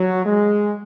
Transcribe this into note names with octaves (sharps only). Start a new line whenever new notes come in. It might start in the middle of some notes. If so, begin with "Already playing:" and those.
Already playing: F#3
G#3